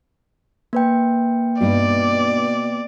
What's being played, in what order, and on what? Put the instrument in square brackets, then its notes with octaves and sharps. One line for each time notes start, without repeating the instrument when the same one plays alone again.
[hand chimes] A#3 B4 G5
[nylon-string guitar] G2 D#4 [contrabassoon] B2 [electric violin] D5